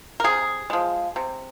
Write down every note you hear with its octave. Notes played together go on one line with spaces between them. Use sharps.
A#4
C3 G#4
F3 G#3
C3